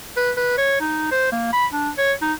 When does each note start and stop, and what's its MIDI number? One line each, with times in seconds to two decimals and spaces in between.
0.17 0.31 71
0.37 0.56 71
0.58 0.79 73
0.81 1.07 63
1.12 1.30 72
1.32 1.51 58
1.53 1.66 83
1.73 1.90 62
1.98 2.13 73
2.22 2.33 63